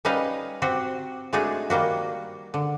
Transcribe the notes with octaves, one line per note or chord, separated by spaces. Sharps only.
G3 C#4 D#4 B4 D#5 F5
C4 F#4 G4
G#3 A3 D4 D#4 F#4 G#4
D#3 G3 A#3 F#4
D3